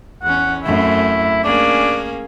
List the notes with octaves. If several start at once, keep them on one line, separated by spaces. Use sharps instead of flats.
E2 C#4 F#5
F#2 A3 C4 E4
A#3 C#4 D4 G#4